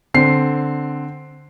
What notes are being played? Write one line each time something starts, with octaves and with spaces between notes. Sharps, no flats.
D3 C4 C7